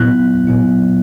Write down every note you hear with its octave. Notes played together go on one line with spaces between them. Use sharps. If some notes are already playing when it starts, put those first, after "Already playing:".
Already playing: A#2 F#3 B3 E4 F#6
A#2 F#3 B3 E4